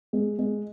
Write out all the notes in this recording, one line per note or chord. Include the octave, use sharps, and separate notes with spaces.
G#3
G#3